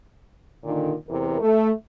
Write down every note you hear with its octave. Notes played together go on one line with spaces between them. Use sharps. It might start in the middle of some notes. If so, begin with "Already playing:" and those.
A#2 D3 D#3
E2 C3 E3 A#4
A3